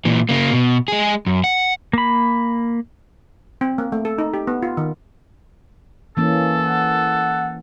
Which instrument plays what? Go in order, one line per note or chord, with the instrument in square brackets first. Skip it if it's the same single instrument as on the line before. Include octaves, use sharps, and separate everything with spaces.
[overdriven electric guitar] A#2 E3
C#3 A#3
B2
G#3 G#4
F#2
F#5
[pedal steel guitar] A#3 B5
[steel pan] C4
A#3
A3
A4
D#4
G4
B3
F4
D#3
[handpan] E3 A#3 C#4 [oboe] A4
[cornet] F#5